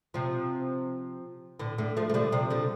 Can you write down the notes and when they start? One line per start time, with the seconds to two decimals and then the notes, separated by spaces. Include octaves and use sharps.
0.14 C3 F3
1.59 A2 D3
1.78 A2 D3
1.97 F3 A3
2.09 A3
2.14 D3 G3
2.32 C3 F3
2.50 D3 G3